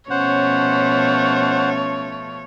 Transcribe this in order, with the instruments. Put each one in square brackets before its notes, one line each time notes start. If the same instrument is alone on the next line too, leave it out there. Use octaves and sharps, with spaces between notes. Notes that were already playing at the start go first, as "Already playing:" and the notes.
[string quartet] B2 F3 A3 [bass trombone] C#4 [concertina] C5 F#5 [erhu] C#5